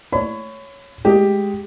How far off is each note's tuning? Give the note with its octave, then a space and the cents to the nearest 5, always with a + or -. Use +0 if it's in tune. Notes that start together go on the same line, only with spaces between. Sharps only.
C#5 +0 B5 +30
G#3 +0 G4 +0